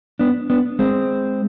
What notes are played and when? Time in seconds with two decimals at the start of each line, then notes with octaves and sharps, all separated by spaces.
0.19 B3 D4
0.50 B3 D4
0.79 G#3 C4